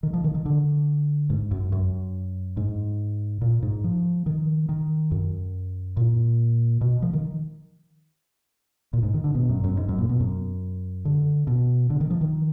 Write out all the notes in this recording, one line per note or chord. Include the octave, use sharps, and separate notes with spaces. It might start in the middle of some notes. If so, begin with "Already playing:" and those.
D#3
F3
D#3
D#3
D3
G#2
F#2
F#2
G#2
A#2
G#2
F3
D#3
D#3
F#2
A#2
B2
F3
D#3
A#2
G#2
D#3
D3
B2
F#2
F#2
G#2
F#2
A#2
B2
F#2
D3
B2
D3
D#3
F3
D#3